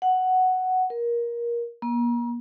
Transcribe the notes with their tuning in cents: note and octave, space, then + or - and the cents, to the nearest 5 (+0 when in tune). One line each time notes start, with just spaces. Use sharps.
F#5 +5
A#4 +20
A#3 +40